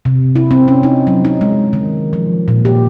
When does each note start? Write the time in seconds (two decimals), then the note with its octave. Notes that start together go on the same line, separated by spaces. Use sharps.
0.05 C3
0.36 E4
0.51 C4
0.68 C#4
0.83 D#4
1.07 F#3
1.25 D#4
1.41 G#3
1.73 D#3
2.13 F3
2.48 A#2
2.65 G4